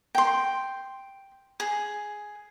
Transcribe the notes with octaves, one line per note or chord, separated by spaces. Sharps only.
G5 C6
G#4